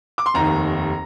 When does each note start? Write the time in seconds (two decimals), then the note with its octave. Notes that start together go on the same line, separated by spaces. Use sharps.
0.18 D6
0.26 C6
0.34 F1 D#2 D#3 A#5